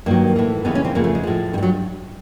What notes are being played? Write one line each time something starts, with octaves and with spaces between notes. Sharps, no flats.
G2 D#3 F#3 A#3
A2 E3
D#2 C#3 E3 B3
C#4
C4
E2 C#3 F3 A#3
A3
G#3
A2 F3
G2 E3 G3
F#3